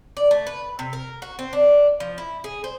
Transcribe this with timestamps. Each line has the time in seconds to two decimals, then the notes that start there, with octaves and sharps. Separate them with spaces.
0.17 D5
0.31 A3
0.47 B4
0.79 C3
0.93 A#4
1.22 F#4
1.39 C4
1.53 D4
2.00 F3
2.18 E4
2.44 G#4
2.64 C5